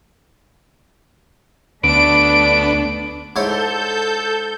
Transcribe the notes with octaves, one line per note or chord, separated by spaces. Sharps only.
D2 A3 B3 D4 D7
G#2 E4 A4 C#5 G6